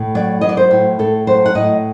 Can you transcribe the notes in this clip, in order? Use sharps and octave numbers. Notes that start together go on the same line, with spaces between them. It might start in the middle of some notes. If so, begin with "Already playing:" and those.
Already playing: A2
F#3 D5
F#3 D#5
D5
C5
A2
A2 A4
F#3 C5
F#5
A2 D#5